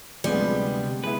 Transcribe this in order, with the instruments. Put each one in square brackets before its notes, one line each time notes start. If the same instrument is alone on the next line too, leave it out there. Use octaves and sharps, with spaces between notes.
[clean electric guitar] D2 C3 [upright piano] F3 G#3 B3 [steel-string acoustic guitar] G3
[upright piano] G#3 B3 E4 [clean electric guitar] B4